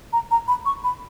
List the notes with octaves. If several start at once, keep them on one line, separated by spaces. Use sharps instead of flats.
A#5
A#5
B5
C#6
B5